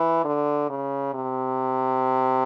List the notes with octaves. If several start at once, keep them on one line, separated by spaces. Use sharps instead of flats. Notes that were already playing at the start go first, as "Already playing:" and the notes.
Already playing: E3
D3
C#3
C3